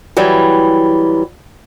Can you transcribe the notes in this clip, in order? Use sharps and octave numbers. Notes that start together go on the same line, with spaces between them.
E3 F#3 G3